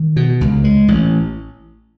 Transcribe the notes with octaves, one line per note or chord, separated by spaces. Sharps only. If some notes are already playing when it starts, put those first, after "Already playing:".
Already playing: D#3
B2
C#2
G#3
A1